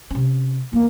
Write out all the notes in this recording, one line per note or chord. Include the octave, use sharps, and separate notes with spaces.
C3 C#4
E2 A#3